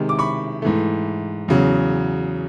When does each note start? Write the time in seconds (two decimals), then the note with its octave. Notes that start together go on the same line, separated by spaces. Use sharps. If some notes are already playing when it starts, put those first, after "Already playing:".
Already playing: C3 D#3 G#3
0.09 D6
0.19 B5 C#6
0.62 G#2 E3 A3
1.48 E2 C#3 F#3